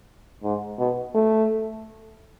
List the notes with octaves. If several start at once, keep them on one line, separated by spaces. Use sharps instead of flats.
G#2
B2
A3